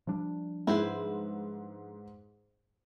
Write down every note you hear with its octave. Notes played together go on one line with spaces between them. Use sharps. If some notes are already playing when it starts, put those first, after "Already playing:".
F3 G3 D4
G#2 E4 B4 C5